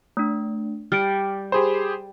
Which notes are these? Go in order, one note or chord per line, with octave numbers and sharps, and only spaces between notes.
A3 D4
G3 F6 D7
G4 G#4 C5 B5